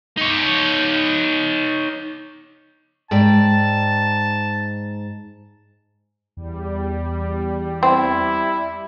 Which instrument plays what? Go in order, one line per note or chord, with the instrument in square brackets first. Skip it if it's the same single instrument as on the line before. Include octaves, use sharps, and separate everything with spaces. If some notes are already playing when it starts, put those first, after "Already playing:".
[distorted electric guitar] D#4 C#5
[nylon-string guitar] G#2 D5 G5 [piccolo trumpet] A5
[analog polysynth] E2 [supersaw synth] G3
[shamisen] C4 [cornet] E4